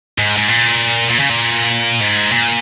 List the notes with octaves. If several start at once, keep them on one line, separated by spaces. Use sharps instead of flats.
G#2
G#2
A#2
A#2
C#3
A#2
G#2
A#2